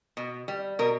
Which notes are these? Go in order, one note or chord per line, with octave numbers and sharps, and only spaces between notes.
B2
G3
B2 A#4